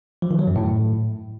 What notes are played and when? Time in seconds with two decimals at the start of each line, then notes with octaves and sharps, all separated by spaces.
0.22 F3
0.31 D#3
0.39 F#3
0.47 F#2
0.56 A2